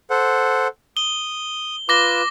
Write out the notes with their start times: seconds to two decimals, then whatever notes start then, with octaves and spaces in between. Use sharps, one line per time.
0.10 A4 C5 F#5
0.97 D#6 G7
1.89 F4 B4 D6 A#6 G7